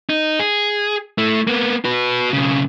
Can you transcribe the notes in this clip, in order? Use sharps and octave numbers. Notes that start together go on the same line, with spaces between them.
D#4
G#4
A3 E4
A#3 B3
F#4 B4
B1 C#3